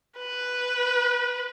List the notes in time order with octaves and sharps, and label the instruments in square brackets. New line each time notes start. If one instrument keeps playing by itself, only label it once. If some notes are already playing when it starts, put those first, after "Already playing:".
[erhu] B4